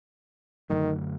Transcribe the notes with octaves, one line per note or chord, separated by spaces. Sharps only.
F#2 D3 D#3 F#3 A3